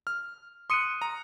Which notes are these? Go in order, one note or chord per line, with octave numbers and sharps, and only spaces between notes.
F6
C6 D#6 F#6 C#7 D#7
A#5